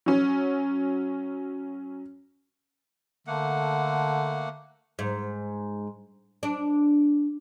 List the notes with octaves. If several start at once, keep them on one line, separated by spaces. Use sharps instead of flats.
F#3 C#4
D3 A3 A#3 F#5
G#2
D4